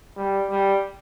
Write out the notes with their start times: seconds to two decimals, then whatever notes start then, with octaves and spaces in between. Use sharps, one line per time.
0.17 G3
0.50 G3